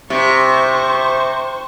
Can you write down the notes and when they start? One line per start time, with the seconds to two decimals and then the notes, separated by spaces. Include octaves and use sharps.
0.10 C3 C5 C#6